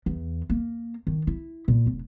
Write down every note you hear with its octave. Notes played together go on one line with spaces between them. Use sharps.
E2
A#3
D#3
E4
A#2
F1